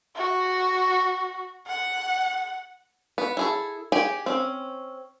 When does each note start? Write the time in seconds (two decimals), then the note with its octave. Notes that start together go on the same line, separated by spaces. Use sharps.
0.16 F#4
1.67 F#5
3.18 B3
3.37 E4 G#4 A4
3.92 G4 G#4 G5 G#5
4.26 C4 C#4